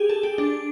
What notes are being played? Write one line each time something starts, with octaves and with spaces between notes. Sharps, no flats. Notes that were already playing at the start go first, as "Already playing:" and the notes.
Already playing: G4 G#4
A4
G4
D4